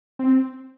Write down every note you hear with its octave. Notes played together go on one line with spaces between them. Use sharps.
C4